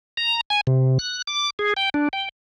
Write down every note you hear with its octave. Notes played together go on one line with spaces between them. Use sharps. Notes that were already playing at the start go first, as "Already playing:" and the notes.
A#5
G#5
C3
F#6
D6
G#4
G5
D4
G5